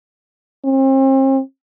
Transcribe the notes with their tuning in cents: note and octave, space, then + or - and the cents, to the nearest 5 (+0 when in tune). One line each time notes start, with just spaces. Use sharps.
C4 +40